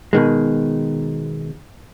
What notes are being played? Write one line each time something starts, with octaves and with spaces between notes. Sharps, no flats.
B2 D#3 G#3